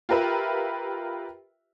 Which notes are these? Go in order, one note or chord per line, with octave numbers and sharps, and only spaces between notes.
F4 G4 A#4 B4 E5